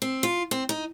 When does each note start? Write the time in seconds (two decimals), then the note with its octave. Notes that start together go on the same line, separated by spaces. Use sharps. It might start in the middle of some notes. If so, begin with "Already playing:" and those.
0.02 C4
0.23 F4
0.51 C4
0.69 D#4